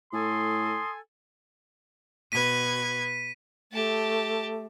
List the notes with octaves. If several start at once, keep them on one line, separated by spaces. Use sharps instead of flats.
A2 A4 G#5 C6 D#6
B2 B4 G#6 B6 D#7
A3 G4 A5